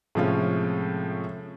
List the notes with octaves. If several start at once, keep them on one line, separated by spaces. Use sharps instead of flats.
A2 C3 F3 G#3 C#4 F4